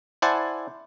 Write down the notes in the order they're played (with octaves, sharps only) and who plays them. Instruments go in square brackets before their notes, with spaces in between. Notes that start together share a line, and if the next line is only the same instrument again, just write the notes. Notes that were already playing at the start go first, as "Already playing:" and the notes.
[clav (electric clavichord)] E4 C5 D5 F#5 G#5 A5